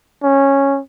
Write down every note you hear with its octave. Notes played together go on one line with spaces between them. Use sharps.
C#4